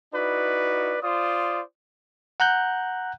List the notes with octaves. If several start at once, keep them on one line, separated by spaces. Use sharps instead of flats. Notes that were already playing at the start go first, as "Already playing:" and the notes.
D#4 E4 F#4 B4 D5
F4 C5 D5 D#6
F#5 A#5 F#6 G6